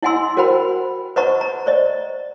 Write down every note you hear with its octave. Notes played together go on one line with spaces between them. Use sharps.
E4 D#5 F#5 G#5 C6 E6
F#4 A#4 C5 F#5 G5 B5
B4 C5 D#5 F#5 A#5 C#6
A#5
C5 D5 D#5